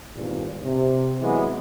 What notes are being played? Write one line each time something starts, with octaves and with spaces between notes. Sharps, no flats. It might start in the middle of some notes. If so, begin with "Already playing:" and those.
G#1 E2 G2 A#2
C3
E3 F#3 G#3 B3